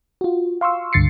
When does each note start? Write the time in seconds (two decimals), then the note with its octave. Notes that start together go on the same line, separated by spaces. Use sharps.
0.21 F4 F#4
0.61 F5 C6 C#6 E6
0.93 C#2 G2 D3 A6 C7 C#7